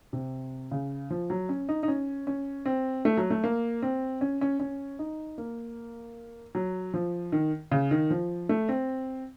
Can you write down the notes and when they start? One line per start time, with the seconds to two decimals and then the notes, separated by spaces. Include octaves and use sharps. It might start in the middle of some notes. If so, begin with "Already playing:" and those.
0.13 C3
0.71 C#3
1.10 F3
1.30 F#3
1.49 C#4
1.69 D#4
1.83 D#4
1.88 C#4
2.27 C#4
2.65 C4
3.05 A3
3.17 F#3
3.30 A3
3.44 A#3
3.82 C4
4.21 C#4
4.41 C#4
4.60 C#4
4.99 D#4
5.38 A#3
6.55 F#3
6.94 F3
7.32 D#3
7.72 C#3
7.91 D#3
8.10 F3
8.49 A3
8.69 C4